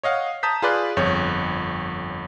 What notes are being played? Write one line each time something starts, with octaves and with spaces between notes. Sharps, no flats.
C#5 D#5 F5 F#5
A5 A#5 D#6 G6 B6
F4 G#4 B4 D5 C6 F#6
G1 F2 C#5 G6